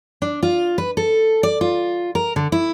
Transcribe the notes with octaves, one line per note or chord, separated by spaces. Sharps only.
D4
F4
B4
A4
D5
F4
A#4
D3
E4